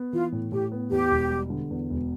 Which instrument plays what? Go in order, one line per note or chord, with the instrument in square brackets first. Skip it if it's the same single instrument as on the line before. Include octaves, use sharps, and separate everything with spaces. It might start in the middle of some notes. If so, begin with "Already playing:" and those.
Already playing: [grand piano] B3
[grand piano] E3 [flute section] F4
[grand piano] A2
[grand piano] A2 [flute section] G4
[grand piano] B3
[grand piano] E2 [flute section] G4
[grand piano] E1
G3
D3
E2
E1